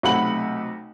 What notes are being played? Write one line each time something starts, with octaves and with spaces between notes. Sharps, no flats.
B1 C3 A3 F#5 B5 F#7